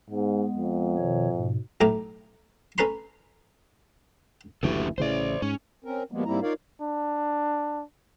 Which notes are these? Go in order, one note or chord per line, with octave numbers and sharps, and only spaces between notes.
G#2 G#3 B3
F2
B2 D#3 C#5
G#2 B2
B1 A2 A#5 D6
C#4 A4 B4 A#5 C6
F#1 D2 E3 C#4 G4 A4
A1 C#3 E3 C5 D5
G#2 C#4
C4 C#4 A#4
B2 F3 G3 G#3 A#3 B3
G#2 G3 A#3 C4 E4 A#5
D#4 F4 A#4 C#5 D5 F5
D4